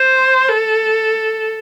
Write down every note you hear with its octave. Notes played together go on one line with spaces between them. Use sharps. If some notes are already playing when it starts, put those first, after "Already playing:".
Already playing: C5
A4